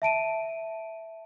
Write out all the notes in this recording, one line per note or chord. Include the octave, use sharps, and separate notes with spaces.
E5 A5 D7 D#7